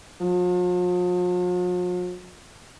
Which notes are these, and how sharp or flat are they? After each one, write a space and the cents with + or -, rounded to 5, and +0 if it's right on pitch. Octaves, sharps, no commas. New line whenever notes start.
F3 +45